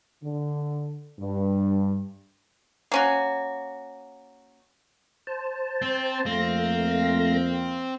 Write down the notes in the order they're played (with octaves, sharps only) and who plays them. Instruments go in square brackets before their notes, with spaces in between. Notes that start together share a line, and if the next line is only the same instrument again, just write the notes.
[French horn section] D3
G2
[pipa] A#3 C#4 F#4
[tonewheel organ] C5 A5
[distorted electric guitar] C4
[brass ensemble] F2 A#3 F5 [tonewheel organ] A3 A#6 [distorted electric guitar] C4